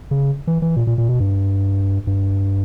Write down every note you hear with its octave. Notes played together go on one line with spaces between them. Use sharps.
C#3
E3
E3
A#2
A#2
A#2
B2
G2
G2